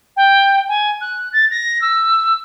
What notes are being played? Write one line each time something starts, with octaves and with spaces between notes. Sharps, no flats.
G5
G#5
F#6
A6
A#6
E6